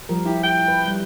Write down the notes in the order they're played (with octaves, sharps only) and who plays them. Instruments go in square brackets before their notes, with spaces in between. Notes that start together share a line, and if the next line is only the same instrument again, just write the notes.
[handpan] F3 G3 A#4
[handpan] E4 [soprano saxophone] G4
[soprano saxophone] G5
[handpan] B4
G3